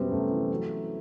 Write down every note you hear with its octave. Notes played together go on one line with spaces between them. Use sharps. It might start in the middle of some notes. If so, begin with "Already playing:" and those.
Already playing: F#2 C3 F#3 G3 B3 C4
F#2 A3
E3
F#3